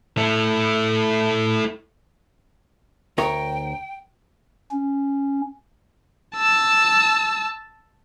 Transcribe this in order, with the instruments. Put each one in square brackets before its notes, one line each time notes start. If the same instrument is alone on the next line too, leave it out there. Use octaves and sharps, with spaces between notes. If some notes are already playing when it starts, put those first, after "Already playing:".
[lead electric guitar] A3 E4
[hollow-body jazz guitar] D2 A#4 C#5 [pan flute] G5
[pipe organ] C#4
[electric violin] A5 E6